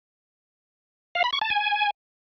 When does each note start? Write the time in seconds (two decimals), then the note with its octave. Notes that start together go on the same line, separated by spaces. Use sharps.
1.15 F5
1.24 B5
1.33 C#6
1.41 A5
1.50 G#5